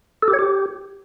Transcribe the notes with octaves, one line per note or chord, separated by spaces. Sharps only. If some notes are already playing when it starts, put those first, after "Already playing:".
A4
G4
C#5
G4